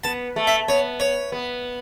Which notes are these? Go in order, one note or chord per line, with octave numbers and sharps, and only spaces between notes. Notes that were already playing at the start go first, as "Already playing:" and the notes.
B3 A5
A3
E5
B3 C#5
C#5
B3